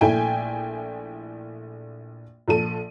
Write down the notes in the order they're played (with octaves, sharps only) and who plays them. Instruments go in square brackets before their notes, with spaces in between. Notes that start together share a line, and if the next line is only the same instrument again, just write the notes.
[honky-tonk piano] A#1 A3 E4 G5 G#5
A#1 F3 A4 D#7